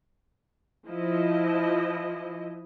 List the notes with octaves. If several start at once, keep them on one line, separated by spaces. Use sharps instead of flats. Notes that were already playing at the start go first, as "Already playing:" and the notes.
F3 E4 D#5